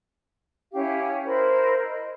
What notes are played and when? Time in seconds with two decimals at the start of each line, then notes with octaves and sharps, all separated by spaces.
0.73 C#4 E4 G4 F5
1.25 E4 A#4 C5 B5
1.84 D#5